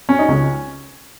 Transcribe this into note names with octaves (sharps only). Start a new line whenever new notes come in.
C#4
D#4
C#2 C#4